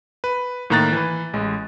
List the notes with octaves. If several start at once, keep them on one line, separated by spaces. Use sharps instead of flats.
B4
A2 D#3 A#3 A#5 F#6 A6
E3 B4
A1 G#3